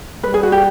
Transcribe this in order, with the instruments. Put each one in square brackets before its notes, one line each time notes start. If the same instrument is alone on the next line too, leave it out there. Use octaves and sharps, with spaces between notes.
[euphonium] G3 [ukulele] B4
[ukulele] G#4
F#4
G4